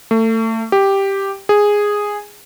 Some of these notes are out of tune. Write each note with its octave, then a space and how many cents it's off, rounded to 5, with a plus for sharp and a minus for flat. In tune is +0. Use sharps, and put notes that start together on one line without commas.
A3 +30
G4 +0
G#4 -5